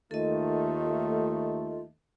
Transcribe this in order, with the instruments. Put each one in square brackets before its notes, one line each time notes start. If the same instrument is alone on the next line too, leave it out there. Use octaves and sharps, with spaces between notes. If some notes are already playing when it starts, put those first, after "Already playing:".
[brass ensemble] D#2 D#3 A3 [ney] F4 [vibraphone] A4 D#5